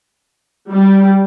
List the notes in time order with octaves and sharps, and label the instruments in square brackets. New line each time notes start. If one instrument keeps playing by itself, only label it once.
[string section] G3